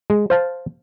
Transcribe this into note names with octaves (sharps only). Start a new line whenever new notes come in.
G#3
C5 F5 A5